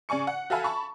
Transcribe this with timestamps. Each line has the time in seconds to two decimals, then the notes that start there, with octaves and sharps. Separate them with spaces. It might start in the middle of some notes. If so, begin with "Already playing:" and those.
0.09 C#3 D5 G#5 C#6 C#7
0.27 F#5
0.50 F#4 A4 E5 F5 G#5 B5
0.64 A5 B5 C#6